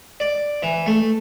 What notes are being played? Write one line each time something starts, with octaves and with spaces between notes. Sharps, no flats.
D5
E3
A3